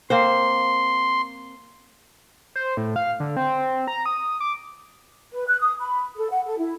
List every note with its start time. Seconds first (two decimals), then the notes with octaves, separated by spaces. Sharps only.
0.10 A#3 C4 C5 C6
2.56 C5
2.77 A2
2.96 F5
3.20 D3
3.36 C4
3.88 A#5
4.06 D#6
4.40 D6
5.32 B4
5.48 F#6
5.60 D#6
5.80 B5
6.17 A4
6.31 F#5
6.46 A4
6.58 E4